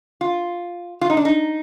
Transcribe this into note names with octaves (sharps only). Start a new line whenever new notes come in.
F4
F4
D#4
D4
D#4